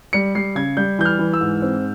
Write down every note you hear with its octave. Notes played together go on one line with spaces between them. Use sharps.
G3 C#7
G3 C7
C#3 G#6
G3 G6
E3 G6
F6
E3
E6
G#2
C4